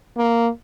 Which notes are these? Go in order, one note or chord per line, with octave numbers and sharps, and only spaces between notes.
A#3